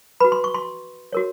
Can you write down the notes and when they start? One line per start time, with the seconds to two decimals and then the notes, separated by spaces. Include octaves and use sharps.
0.20 F#4 B4 B5
0.32 C6
0.44 C#6
0.55 C6
1.13 F#4 A#4 C#5